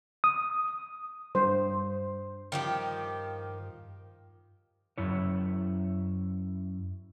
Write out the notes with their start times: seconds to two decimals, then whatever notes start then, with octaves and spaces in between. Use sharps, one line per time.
0.24 D#6
1.35 G2 C5
2.52 D#3 F3 G4
4.98 F#2 E4 C#5